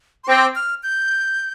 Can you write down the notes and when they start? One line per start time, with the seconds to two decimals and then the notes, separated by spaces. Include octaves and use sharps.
0.24 C6
0.28 C4 D6
0.56 F6
0.83 G6